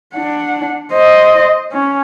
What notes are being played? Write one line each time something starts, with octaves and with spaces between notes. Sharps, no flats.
D4 F#5
C5 D#5
C#4